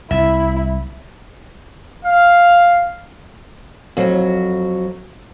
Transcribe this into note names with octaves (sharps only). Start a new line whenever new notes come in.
C2 E4 E5
F5
F2 F#3